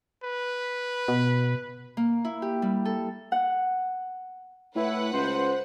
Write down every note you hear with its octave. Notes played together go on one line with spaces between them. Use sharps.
B4
B2
A#3
E4
G4
G3
A4
F#5
A2 E4 B4 F#5
C#2 C5